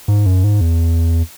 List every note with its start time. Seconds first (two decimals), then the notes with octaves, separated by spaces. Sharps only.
0.08 G#2
0.26 F#2
0.44 G#2
0.61 E2